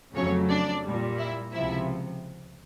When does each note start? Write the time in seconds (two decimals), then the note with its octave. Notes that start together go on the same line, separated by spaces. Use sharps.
0.15 F2 C#3 F#3 A3 C#4 C#5
0.49 D4 D5
0.84 A#2 G3
1.18 E4 E5
1.52 C#2 C3 F3 E4 E5